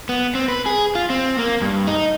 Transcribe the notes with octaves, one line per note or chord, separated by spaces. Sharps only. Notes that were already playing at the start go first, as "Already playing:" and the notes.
B3
C4
B4
G#4
F4
C4
A#3
G2
D#4